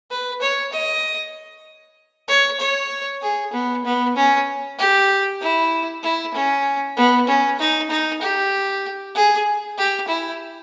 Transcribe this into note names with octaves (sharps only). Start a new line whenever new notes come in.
B4
C#5
D#5
C#5
C#5
G#4
B3
B3
C#4
G4
E4
E4
C#4
B3
C#4
D#4
D#4
G4
G#4
G4
E4